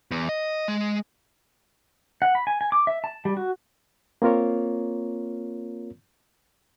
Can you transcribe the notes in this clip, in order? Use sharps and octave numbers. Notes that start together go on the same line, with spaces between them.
E2
D#5
G#3
F#5
B5
G#5
G#5
D6
E5
A5
G3
F#4
A#3 C4 F4 A#4 C#5